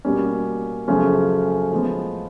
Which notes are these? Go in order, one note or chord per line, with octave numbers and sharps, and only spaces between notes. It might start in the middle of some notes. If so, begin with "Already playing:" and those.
B2 G3 A#3 C#4
F#2 C#3 F3 A3 C#4
A2 F3 G#3 B3